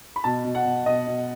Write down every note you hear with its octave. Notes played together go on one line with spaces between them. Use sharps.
B5
B2 A5
B2
F#5
B2
B2 D#5
B2